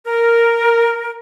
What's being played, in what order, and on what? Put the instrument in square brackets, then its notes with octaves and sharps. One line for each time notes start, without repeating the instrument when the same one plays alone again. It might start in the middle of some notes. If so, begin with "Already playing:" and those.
[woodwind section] A#4